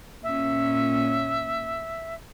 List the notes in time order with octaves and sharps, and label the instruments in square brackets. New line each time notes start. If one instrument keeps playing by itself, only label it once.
[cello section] A#2 C#4 [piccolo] E5